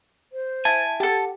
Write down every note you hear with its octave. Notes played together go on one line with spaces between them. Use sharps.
C5
E4 G#5 A5
G4 A4 F#5 A5